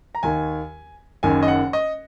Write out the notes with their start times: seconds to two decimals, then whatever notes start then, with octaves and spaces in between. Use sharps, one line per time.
0.15 A#5
0.23 D#2 D#3 G#5
1.23 F#1 F#2 D#3 G#5
1.42 D#5
1.48 F#5
1.73 D#5